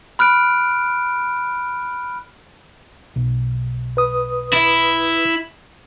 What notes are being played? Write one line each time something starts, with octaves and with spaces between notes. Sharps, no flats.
B5 F6 F#6 D7
B1
B4 D#6
E4